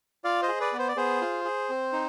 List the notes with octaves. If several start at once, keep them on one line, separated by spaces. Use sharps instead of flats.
F4 D5 F5
C5 D#5
G#4
B4 D5
B3
C5
D5
B3 G#4 C5
F4
G#4
C4
D#4